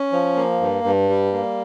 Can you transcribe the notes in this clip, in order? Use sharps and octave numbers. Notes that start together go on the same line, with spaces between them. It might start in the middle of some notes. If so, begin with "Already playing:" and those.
Already playing: C#4
F3
A#3
G2
G2
G3
A#3